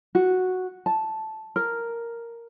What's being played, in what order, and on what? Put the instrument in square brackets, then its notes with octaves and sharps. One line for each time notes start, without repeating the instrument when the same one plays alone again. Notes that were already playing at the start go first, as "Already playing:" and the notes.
[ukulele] F#4
A5
A#4